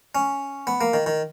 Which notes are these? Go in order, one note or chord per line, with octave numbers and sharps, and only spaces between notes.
C#4
B3
A#3
D#3
D#3